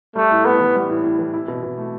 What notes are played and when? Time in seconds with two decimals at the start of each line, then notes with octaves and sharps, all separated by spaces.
0.16 G3 A3
0.31 A2
0.45 A2 B3
0.60 E3
0.75 G3
0.90 A2
1.04 A2
1.19 E3
1.34 E4
1.48 B2
1.63 B2
1.78 A3